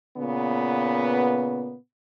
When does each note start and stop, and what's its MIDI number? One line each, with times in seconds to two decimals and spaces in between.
0.17 1.75 46
0.17 1.75 49
0.17 1.75 59